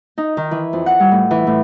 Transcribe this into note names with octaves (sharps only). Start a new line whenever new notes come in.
D#4
D#3
E3
F2
F#5
G3
A2
E3
A2